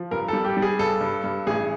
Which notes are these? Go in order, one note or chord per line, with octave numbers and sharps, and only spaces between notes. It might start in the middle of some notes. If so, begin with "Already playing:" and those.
Already playing: F3
G2 A#4
G3 A4
G4
G3
G#4
G2 A4
G2
G2
A1 G#4